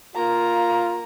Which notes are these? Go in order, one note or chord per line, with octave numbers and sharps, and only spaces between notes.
A#3 F4 A#5